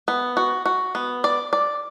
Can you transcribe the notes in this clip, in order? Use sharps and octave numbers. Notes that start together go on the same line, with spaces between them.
B3
F#4
F#4
B3
D5
D5